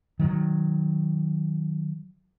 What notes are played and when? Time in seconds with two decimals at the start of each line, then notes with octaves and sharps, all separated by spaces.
0.19 D#3 F#3